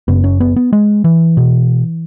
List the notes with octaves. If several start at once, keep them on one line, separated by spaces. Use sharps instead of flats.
F#1 F#2 C#3 B3
C#4
B3
B3
G#3
E3
B2